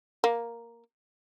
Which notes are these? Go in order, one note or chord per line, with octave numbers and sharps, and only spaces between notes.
A#3